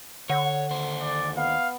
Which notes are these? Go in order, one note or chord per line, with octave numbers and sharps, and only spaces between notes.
D3 C#5 F#5
D#2 C5
D5
B3 F5